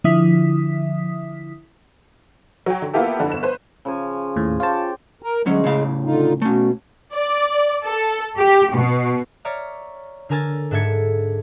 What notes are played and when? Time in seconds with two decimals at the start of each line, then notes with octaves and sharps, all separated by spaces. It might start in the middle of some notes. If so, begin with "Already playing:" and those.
0.04 D3 F3 E4 E5 D#6 B6
2.66 F#3 G5
2.82 D3
2.93 A#3 B3 E4 F4 G4 A4
3.20 F2 D3 D4
3.32 G1 E7
3.43 B4 C5
3.85 C#3 F3 G#5
4.36 D#2 A2
4.60 F4 G4 C5 C#5 A5
5.23 A#4
5.46 D2 F#3 G#3 C#4
5.64 A2 C#3 F5
6.05 D3 D#4 F4
6.42 B2 A3 C#4
7.14 D5
7.85 A4
8.39 G4
8.75 B2
9.45 C#5 D5 E5 A#5 F6
10.29 D3 D4 A#4 G#5 E6 A6
10.71 G#2 D4 A4 E5 G#6 C#7